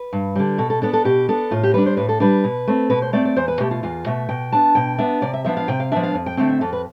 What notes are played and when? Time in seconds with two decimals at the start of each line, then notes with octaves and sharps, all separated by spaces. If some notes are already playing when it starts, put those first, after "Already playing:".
Already playing: B4
0.13 G2
0.36 D3 G3
0.58 B2 A4
0.70 A4
0.82 B3 D4 A4
0.93 A4
1.04 B2 G4
1.29 B3 D4 A4
1.51 A2 F4
1.63 G4
1.74 G3 D4 B4
1.86 C5
1.97 A2 B4
2.09 A4
2.20 G3 D4 B4
2.44 B2
2.67 A3 C4
2.90 B2 B4
3.02 C5
3.13 A3 C4 D5
3.25 D5
3.36 E2 C5
3.48 B4
3.60 B2 A3 G4
3.71 F4
3.83 E2 F4
4.06 B2 A3 E5
4.29 B2 G5
4.52 B3 D4 A5
4.75 B2 G5
4.98 B3 D4 E5
5.22 C3 D5
5.34 E5
5.45 F3 B3 D4 E5
5.57 F5
5.68 C3 G5
5.80 F5
5.92 F3 B3 D4 E5
6.03 F5
6.14 F2
6.26 G5
6.37 D3 A3 C4 G5
6.49 E5
6.61 F2 A4
6.73 B4